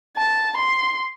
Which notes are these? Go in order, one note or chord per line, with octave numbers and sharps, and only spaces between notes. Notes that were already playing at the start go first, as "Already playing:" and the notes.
A5
C6